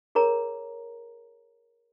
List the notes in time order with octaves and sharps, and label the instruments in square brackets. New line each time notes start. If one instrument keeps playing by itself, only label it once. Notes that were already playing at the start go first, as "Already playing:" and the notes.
[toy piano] G#4 A#4 C#5 A#5